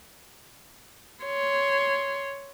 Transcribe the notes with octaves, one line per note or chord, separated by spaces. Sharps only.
C#5 C6